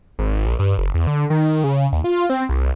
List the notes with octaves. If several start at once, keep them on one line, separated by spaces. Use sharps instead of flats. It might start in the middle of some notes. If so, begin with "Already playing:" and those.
G#1
A#1
G2
F#1
E2
D3
D#3
C#3
D#2
F4
C4
C2